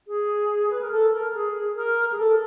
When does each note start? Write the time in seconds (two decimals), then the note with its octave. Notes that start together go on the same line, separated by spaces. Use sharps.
0.08 G#4
0.71 B4
0.81 A#4
0.91 A4
1.13 A#4
1.34 G#4
1.76 A#4
2.12 G#4
2.18 A4